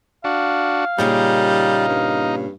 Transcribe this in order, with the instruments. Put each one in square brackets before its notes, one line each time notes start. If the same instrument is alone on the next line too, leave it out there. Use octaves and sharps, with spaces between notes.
[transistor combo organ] D4 F#4 [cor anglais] F5
[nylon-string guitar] A#2 C#3 A#3 [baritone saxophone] G3 [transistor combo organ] D#4
[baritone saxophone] G2